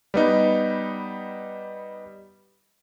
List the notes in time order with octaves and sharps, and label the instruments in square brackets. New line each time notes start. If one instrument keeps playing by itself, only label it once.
[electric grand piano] G3 B3 D#4